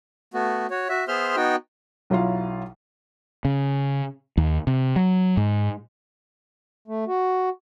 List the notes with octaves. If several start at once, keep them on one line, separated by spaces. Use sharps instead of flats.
A3 B3 F#4
F#4 C#5
F#4 E5
B3 G#4 C5 E5 C6 F6
B3 D#4 F#4 G5
B1 F#3 E4 F4 F5
C#3
D#2
C3
F#3
G#2
A3
F#4